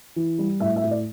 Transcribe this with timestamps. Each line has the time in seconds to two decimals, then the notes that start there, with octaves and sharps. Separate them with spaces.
0.16 E3
0.39 G3
0.60 A2 E5
0.76 E5
0.84 A2
0.91 D5